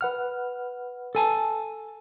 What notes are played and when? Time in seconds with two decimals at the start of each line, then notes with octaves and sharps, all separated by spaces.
0.01 B4 F#5 F6
1.15 A4 G#5 A5